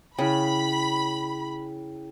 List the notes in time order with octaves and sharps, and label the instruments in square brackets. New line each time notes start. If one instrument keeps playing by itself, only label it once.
[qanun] C#3 [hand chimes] E4 G#4 G5 [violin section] B5